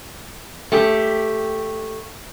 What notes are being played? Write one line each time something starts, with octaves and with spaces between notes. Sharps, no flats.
A3 G4